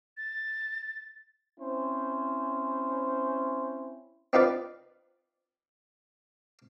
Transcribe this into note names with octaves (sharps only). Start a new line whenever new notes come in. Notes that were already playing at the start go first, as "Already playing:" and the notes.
A6
C4 C#4 E4 C5
C4 D#4 F4 B4 D5